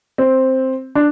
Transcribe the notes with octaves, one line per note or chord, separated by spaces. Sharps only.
C4
D4